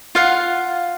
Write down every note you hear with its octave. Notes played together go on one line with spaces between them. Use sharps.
F4 F5 F#5